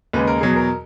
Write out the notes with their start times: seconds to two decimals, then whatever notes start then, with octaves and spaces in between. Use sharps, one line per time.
0.13 D#2 C#3 G#3 B4
0.27 A#4
0.41 E2 B2 F#3 G#4
0.56 A#4